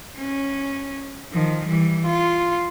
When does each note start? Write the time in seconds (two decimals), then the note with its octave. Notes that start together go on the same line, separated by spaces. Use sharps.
0.17 C#4
1.32 D#3 F3
1.65 E3 G3
2.05 F4